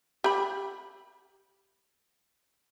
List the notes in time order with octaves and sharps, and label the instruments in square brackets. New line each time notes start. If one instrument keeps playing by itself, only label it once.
[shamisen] G4 B5